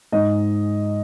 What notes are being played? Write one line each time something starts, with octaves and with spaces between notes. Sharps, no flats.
G#2 D#5